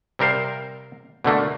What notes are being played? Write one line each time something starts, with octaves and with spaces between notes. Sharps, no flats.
C3 G3 A#4 C5 F5
B2 D3 A3 A#3